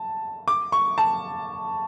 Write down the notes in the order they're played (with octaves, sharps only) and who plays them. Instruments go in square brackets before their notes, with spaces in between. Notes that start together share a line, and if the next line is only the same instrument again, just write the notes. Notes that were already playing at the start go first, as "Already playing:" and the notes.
Already playing: [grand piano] A5
D6
C#6
A5